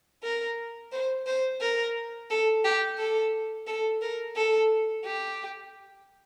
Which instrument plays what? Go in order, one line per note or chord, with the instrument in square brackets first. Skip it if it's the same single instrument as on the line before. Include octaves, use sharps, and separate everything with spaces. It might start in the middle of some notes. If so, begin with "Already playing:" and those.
[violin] A#4
C5
C5
A#4
A4
G4
A4
A4
A#4
A4
G4